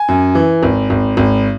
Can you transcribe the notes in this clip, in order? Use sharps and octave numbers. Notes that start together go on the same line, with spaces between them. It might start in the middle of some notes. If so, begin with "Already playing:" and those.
Already playing: G#5
F#2
E3
G#1
G#1
G#1